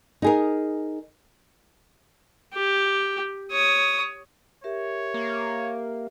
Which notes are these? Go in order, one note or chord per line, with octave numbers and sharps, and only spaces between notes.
D#4 G#4 A#4
G4
C#5 D#6
G4 A#4 C#5 E5
A#3